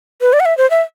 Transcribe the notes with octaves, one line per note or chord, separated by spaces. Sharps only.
B4
D5
F#5
E5
C5
E5